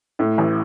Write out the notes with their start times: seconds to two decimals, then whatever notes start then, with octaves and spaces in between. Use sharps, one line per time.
0.19 A2
0.38 A1